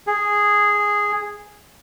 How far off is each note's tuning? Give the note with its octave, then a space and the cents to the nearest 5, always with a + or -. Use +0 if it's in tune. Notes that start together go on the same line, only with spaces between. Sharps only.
G#4 -5